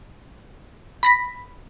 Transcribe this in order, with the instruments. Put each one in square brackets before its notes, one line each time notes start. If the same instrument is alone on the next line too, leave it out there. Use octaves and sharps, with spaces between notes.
[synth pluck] B5 A#6 B6